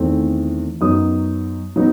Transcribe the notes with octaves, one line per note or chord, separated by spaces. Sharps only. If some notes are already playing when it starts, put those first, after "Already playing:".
Already playing: E2 D#3 A3 C4
F#2 F#3 B3 D#4 D#6
F#3 B3 D#4